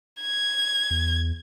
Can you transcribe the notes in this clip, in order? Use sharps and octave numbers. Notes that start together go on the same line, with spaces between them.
G#6
E2